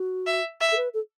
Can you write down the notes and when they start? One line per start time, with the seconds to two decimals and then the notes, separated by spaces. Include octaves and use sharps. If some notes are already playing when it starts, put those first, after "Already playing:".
Already playing: F#4
0.27 E5
0.61 E5
0.72 A4
0.77 B4
0.94 A4